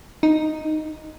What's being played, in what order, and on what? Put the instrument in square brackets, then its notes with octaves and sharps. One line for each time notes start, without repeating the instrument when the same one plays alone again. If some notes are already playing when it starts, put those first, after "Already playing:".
[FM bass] D#4